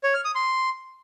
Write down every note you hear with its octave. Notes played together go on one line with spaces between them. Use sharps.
C#5
F6
D#6
C6